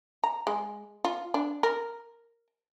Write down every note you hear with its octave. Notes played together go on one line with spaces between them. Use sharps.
A#5
G#3
F4
D4
A#4